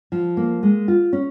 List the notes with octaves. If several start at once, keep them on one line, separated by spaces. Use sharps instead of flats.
F3
A#3
G#3
F4
C#4